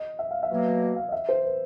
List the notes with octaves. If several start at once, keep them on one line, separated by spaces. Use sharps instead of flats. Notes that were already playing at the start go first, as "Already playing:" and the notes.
Already playing: D#5
E5
F5
E5
B2 F#3 A#3
F5
D#5
E5
C5
B4